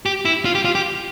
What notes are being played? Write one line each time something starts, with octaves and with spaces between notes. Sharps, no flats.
G4
E4
F4
G4
F4
G4